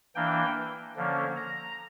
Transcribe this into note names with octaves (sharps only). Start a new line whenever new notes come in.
E3 A#3 D4 G5
D3 F3 A#3 C#4
A#5